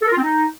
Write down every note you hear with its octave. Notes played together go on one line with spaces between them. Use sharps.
A4
A#4
F4
C4
D#4